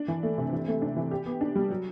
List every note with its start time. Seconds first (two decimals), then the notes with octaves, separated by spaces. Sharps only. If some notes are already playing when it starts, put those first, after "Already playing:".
Already playing: D4
0.08 E3
0.23 A3
0.38 C3
0.52 E3
0.68 A3
0.82 D4
0.96 E3
1.11 G4
1.26 B3
1.41 D4
1.55 G3
1.70 F#3